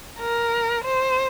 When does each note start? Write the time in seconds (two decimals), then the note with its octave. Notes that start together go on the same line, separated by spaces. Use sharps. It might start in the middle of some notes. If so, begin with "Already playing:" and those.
0.19 A#4
0.84 C5